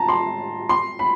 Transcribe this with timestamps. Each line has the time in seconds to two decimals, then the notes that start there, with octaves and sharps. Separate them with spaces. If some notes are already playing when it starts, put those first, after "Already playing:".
Already playing: A5 A#5
0.08 C6
0.69 C6
0.99 B5